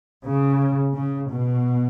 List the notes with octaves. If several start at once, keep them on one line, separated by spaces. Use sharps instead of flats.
C#3
C#3
B2